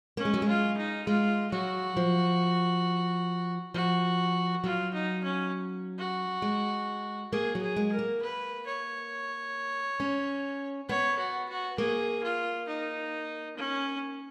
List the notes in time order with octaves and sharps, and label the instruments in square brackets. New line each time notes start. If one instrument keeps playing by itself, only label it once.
[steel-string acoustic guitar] A#3 [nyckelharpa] C#4
[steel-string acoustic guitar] G#3
F#3
G#3
[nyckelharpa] F4
D#4
[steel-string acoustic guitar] G#3 [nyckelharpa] F4
[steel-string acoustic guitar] F#3 [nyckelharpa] F#4
[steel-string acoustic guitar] F3
[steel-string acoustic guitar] F3 [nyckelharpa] F#4
[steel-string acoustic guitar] F#3 [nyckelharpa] F4
[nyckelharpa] D#4
C#4
F#4
[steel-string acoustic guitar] G#3
[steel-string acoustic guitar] A#3 [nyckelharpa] G#4
[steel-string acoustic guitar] F#3
[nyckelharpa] G#4
[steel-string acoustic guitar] G#3
[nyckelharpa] A#4
[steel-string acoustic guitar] A#3
[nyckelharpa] B4
C#5
[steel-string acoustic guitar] C#4
[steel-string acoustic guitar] B3 [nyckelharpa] C#5
[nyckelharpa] F#4
F#4
[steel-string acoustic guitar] A#3 [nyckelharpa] G#4
[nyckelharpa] F4
D#4
C#4